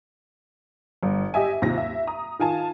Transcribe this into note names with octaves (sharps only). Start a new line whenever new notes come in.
G1
G4 D#5 E5 G#5
D#2 C3 F4 A#6
E5
A#5 D#6
D#3 F4 G#5 A5